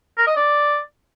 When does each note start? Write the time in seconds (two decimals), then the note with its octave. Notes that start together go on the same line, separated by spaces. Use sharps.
0.18 A#4
0.27 D#5
0.37 D5